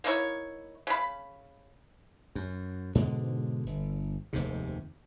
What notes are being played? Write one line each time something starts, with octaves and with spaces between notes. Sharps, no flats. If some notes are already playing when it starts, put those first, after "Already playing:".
A#3 D#4 E4 C#5
C#3 B5
F#2
G#2 B2 D3 G#3
G1
F1 D#2 G#2 C3